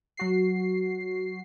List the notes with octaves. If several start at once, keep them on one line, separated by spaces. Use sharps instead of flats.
F#3 F#4 C7